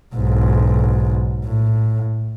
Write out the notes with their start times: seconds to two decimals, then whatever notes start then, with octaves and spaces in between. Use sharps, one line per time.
0.15 B1 G#2
1.45 A2